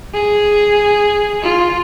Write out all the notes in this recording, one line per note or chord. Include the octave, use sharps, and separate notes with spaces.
G#4
F4